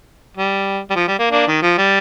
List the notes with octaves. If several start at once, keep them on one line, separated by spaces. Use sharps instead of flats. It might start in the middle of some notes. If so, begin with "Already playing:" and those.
G3
G3
F3
G3
A#3
A#3 D4
D#3
F3
G3